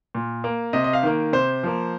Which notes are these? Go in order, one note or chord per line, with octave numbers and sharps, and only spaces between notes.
A#2
A#3
C3 D#5
D#5
F5
D#3 A#3
C3 C5
F3 A#3